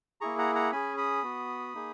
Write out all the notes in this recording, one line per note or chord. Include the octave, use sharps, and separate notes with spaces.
A#3 E4 G#4 A#5 C#6
F#5 A#5
F#5 A#5
C#4 G#4 G#5 B5
B5 D#6
B3 F#4
A#3 D#4 G#4